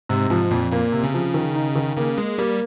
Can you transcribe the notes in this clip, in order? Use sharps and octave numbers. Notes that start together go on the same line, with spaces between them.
G#2 C3
G#2 F3
F2 A#2
A#2 A#3
C3
C#3
F3
D#3
D#4
D#3
C#3 A#3
G#3 A#3
G3 A#3